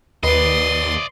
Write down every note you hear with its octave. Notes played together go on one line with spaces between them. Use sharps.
D#2 B4 D5 D#5 C6